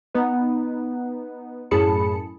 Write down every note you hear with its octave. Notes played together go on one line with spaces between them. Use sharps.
B3 D#4 B4
F#2 A2 G#4 A5 B5 C#7